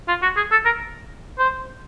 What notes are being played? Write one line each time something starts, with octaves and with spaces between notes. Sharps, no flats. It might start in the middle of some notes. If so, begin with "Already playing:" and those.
F4
F#4
G#4
A4
A#4
C5